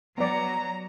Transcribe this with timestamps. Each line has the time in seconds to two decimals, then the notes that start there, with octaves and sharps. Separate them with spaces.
0.18 F#3 B3 D5 A#5